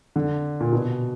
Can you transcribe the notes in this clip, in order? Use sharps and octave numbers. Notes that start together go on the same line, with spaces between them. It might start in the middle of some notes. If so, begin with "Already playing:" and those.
D3
A#2
B2